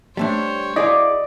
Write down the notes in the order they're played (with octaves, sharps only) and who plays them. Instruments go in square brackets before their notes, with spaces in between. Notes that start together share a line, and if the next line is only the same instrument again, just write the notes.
[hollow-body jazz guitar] G3 A3 D4 [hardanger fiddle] C5 C#5
[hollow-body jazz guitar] E4 G#4 F5 [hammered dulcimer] D5 D6 [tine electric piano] D#5